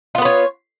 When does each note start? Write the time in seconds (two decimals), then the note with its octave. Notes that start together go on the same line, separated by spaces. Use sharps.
0.15 F4
0.18 B3
0.22 B4
0.25 C#5